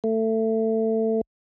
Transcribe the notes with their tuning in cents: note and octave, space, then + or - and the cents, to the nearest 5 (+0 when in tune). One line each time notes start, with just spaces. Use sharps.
A3 +20